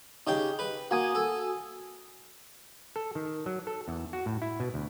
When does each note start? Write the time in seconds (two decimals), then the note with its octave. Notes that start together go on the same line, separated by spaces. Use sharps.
0.27 C#3 D#4 G4 G5
0.59 B4
0.91 A#3 F#4 G#5 D#6
1.15 A4
2.96 A4
3.15 D#3
3.46 F#3
3.67 A4
3.88 E2
4.13 F#4
4.26 A2
4.42 E4
4.60 B2
4.74 D2